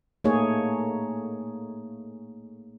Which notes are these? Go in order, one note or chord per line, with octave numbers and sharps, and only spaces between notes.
A3 A#3 D#4 G#4 C#5